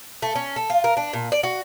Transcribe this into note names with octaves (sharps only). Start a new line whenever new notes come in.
A3
C#4
A4
F4
A#4
D4
A#2
D5
F#4